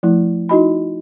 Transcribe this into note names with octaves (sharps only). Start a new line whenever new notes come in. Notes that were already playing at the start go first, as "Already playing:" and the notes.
F3 A3 E4
D#4 E4 F#4 D#5 G#5 B5